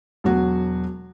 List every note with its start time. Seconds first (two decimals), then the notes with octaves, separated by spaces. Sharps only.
0.24 E1 F#3 F#4